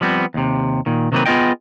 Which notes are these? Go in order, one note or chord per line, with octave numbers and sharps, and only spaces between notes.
F3 G3 B3 C4
D#2 C3
A#2 D#3
C3 D#3 F#3 A#3 C4 B4
B3 F4 G#4 D#5 G5